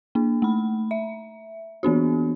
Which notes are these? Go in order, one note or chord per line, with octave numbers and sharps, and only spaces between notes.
A#3 D4
A3 B5
E5
E3 B3 D4 F#4